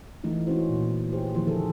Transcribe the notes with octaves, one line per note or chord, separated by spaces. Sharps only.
E3 A3 D#4 F4
G#3 C#4 E4 F#4 C5
A#2
G4 G#4 B4 C5
D#3 F3 A#3 E4 C5
D3 G#4 A4